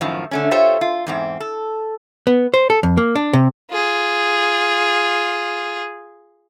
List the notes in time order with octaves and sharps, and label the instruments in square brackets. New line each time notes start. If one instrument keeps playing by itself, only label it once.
[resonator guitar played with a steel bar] F#2 A2 D#3 F3
D3 A3 C#4
F4 G4 A4 C5 C#5 E5
F4
E2 G#2 C4
A4
[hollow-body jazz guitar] B3
C5
A4
F2
A#3
D4
C3
[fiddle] F4 G#4